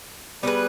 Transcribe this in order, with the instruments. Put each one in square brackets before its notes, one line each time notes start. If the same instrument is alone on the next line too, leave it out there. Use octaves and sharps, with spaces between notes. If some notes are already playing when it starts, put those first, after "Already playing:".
[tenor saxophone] G3 [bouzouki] B3 D4 G#4 B4